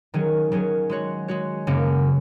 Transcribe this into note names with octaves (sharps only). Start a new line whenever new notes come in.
D#3 F#3 C#4 G#4
D#3 F#3 C#4 G#4
G#3 F#4 C#5
G#3 F#4 C#5
F#2 C#3 A#3 C#4